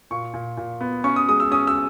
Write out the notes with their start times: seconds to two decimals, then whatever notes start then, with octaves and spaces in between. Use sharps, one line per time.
0.11 A#2 C#6
0.34 A#2
0.57 A#2
0.81 B3
1.04 C#4 C#6
1.16 D#6
1.28 G#3 D#6
1.40 E6
1.52 C#4 D#6
1.67 E6